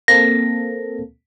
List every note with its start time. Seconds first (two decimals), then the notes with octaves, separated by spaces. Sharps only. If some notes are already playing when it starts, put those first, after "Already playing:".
0.08 A#3 C4 A4 A#6